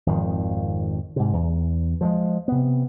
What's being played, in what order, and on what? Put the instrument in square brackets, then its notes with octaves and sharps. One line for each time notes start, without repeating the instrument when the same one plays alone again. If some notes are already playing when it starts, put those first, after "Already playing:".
[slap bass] G#1 F2 D#3 F3
G#2 C3
E2
F3 F#3 G#3
C3 B3